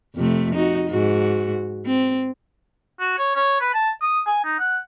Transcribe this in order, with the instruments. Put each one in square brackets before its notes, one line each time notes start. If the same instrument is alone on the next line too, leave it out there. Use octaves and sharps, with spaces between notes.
[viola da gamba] F2 C3 A3
D#4 F#4
G#2 F#4
C4
[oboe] F#4
C#5
C#5
B4
A5
D#6
G#5
D#4
F#5